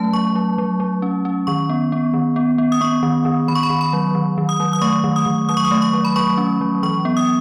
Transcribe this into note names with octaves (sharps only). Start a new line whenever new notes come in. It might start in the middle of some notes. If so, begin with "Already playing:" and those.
Already playing: F#3 A3 C#4 A5
F#3 C#6
F#3
F#3
F#3
C#4
C#4
D#3 C#6
B3
B3
D#3
B3
B3
D#6
B3 C#6
D#3
D#3
D#3 B5
C#6
B5
D#3
B5
F#3
D#3
D#3
D#6
F#3
D#6
A3 C#6
D#3
D#6
D#3
F#3 D#6
C#6
D#6
A3
C#6
F#3
B5
F#3 C#6
C#4
F#3
E3 C#6
B3
D#6